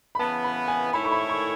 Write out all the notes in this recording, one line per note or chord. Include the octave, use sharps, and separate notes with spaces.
B5
C#3 E3 B3 A5
B5
G#5
D#3 A3 E4 A4 C#5 B5
C#6
B5
C#6